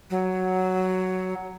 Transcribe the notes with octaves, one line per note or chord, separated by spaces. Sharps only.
F#3